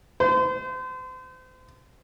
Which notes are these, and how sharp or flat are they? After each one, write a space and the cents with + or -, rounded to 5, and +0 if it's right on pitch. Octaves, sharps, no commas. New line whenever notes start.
C5 -35